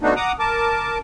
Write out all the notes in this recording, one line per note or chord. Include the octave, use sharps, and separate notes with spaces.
D3 A3 B3 D4 D#4 F#4
F#5 A#5 D6 D#6
A#4 A5 D6